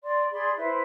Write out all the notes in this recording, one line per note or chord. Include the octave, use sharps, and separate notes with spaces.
D5 C6
G#4 D5 B5 C6
E4 B4 C5 E5